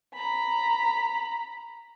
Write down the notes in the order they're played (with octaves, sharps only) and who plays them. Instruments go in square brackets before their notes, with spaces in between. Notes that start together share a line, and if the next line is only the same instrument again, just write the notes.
[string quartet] A#5 B5